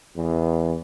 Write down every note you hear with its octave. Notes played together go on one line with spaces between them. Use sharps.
E2